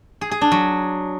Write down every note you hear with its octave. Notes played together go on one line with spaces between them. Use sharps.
G#4
G#4
D4
F#3